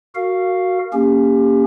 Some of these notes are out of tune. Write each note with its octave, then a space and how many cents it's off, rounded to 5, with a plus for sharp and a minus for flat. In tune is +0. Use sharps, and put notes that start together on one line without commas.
F#4 +0 A#4 -25 F5 +0
A#3 +0 C#4 +0 G4 +30